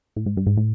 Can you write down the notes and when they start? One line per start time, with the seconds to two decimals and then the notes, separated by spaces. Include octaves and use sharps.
0.16 A2
0.26 G#2
0.37 G2
0.47 G#2
0.57 A2